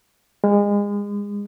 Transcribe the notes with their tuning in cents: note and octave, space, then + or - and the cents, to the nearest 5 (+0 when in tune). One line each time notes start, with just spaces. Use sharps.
G#3 -30